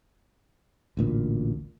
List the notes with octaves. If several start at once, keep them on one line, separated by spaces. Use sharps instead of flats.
A1 D2 A#2